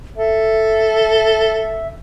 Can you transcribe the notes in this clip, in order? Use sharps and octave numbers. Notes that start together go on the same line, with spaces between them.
A4 E5